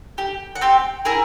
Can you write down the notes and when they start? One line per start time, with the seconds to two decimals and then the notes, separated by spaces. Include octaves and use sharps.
0.18 G4
0.55 F#5
0.61 C4 G4 G5
1.05 E4 G#4 A#4 A#5